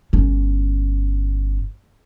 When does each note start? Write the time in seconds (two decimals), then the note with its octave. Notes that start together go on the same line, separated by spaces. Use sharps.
0.13 G1 C#4